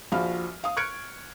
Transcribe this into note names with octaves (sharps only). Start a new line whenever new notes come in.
A#1 F3 F#4 F5 B5 F6
F5 D#6
C#6 F6 F#6 G#6 C#7 D7